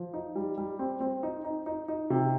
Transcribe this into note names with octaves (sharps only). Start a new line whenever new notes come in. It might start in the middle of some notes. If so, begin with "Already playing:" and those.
Already playing: F3
D#4
G3
G3
C4
C4
D#4
D#4
D#4
D#4
C3